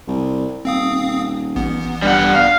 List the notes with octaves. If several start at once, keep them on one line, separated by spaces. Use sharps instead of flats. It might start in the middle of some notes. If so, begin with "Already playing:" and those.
C2
D#1 C4 F5 D#6
A1 B3
G2 G3 F#5
F5